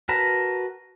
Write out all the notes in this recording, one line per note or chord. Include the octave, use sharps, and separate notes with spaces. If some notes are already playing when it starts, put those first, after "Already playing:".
F#4 A#4 B4 A5 A#5